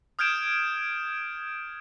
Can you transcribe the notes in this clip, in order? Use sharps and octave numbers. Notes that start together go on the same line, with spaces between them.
D#6 F6 G6 G#6 D7 E7